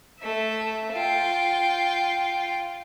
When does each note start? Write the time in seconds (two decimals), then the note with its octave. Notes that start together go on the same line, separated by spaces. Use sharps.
0.20 A3 E5
0.93 F4 G5